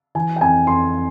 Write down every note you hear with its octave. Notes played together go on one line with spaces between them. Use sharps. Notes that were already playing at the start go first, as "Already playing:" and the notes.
E3 G#5
G5
F2 G#5
F2 C6